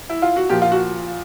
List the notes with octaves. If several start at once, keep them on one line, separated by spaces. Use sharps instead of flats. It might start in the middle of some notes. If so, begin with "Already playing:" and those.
E4
F4
F#4
A#2 F3 G4
F4
F#4